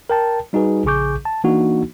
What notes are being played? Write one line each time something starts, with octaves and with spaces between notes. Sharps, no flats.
A#4 G5 A5
G3 D#4 F#4 G#4 B4
A#1 C#3 G#4 C#6 D6 G6
A5
E3 A#3 D4 D#4 F#4